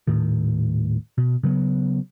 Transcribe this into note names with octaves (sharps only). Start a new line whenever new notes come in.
D#1 A2 D#3
B2
C#3 F#3 G#3 B3